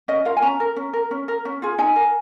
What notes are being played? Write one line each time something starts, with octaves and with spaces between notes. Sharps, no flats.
C#4 D#5
F4 A#4 F5
G#5
C#4 A#5
A#4
C#4
A#4
C#4
A#4
C#4
F4 G#4
D#4 G#5
A#4